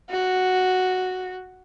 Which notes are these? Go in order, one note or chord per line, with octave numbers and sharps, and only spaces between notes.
F#4